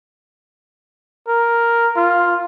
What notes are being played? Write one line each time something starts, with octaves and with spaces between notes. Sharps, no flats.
A#4
F4